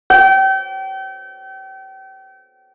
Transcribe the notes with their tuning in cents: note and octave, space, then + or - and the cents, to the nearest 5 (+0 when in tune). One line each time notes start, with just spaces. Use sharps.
G5 -35